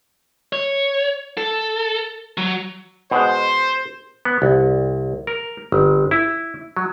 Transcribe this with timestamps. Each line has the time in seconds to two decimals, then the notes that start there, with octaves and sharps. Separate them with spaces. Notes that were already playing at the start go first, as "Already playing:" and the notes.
0.53 C#5
1.38 A4
2.38 F#3
3.11 B2 G#3 C5
4.25 B3
4.42 C2
5.27 A#4
5.72 G1
6.11 E4
6.77 F#3